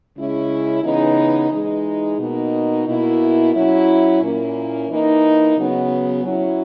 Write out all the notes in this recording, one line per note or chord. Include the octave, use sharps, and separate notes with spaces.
C#3 G#3 C#4 E4
C#3 E3 B3 D#4
E3 G#3 D#4
B2 A#3 D#4
B2 A#3 E4
F#3 C#4 E4
A#2 A#3 C#4 E4
E3 A#3 D#4
C#3 F#3 B3
F#3 C#4 E4